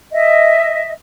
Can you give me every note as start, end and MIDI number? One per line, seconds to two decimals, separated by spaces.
0.12 0.91 75
0.12 0.91 76